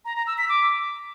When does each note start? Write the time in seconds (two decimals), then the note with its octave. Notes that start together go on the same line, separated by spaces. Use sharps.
0.05 A#5
0.16 A#5
0.27 E6
0.38 B6
0.49 D6